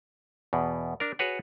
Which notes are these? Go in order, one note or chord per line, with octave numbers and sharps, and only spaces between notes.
E2 B2
D4 A#4
F#4 G#4 B4 C#5 F#5